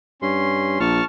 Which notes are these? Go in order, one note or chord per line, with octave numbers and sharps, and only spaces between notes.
G2 C#4 C6
A#1 A5 C#6 F6